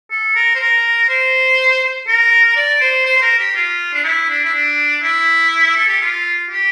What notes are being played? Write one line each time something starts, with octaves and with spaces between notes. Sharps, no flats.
A4
A#4
C5
A#4
C5
A#4
D5
C5
C5
C5
A#4
G4
F4
D4
E4
D4
E4
D4
E4
A4
G4
F4
G4